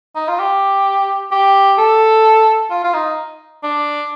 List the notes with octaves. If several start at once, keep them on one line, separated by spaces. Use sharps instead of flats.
D#4
F4
G4
G4
A4
F4
F4
D#4
D4